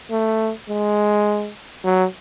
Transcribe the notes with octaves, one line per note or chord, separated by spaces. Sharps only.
A3
G#3
F#3